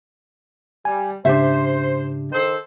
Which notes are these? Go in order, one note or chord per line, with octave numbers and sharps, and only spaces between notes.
G3 G#5
G#2 C#3 D4 G4 C5 E5
D#3 A4 C5